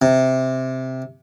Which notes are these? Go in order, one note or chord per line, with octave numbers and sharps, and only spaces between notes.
C3